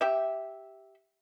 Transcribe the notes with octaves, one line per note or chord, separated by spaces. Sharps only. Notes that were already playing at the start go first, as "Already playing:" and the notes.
G4 E5